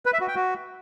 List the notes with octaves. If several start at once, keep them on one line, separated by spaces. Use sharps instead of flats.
B4
E5
F#4
G5
F#4